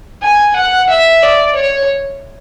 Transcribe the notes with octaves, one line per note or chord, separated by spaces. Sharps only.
G#5
F#5
E5
D5
C#5